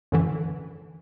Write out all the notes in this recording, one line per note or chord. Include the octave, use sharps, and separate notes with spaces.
F#2 D3 E3